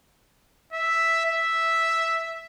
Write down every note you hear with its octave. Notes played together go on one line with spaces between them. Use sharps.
E5
E5